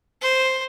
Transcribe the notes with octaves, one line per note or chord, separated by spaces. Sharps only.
C5